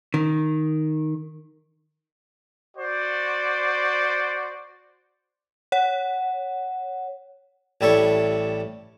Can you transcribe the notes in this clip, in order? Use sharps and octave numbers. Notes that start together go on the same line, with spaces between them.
D#3
F#4 C5 D5
C#5 F#5
A1 G3 E4 A4 C#5 C#6